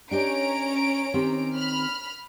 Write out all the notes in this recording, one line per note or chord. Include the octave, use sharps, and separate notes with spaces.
C#4 D4 G4 D#5 A#5 D7
D#3 C4 G4
B5 F6